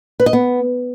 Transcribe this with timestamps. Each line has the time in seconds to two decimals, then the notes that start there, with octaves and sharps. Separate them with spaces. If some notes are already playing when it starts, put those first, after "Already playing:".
0.20 B4
0.26 D#5
0.33 B3